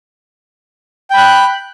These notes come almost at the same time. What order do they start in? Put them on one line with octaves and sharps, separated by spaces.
G5 B5 F#6